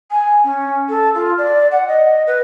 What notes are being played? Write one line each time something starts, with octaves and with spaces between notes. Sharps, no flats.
G#5
C#4
A4
F4
D5
F#5
D#5
B4